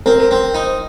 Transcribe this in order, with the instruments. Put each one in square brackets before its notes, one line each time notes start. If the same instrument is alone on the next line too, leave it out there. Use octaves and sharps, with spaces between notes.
[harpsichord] C4 [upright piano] A#4
[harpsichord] C4
D#4